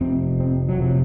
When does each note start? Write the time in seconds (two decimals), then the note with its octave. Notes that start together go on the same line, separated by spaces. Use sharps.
0.01 F1 F2 C3 C4
0.40 C4
0.69 F#3
0.79 F1 C3 F3